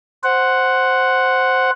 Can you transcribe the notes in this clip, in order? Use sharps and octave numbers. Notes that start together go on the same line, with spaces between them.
C5 F#5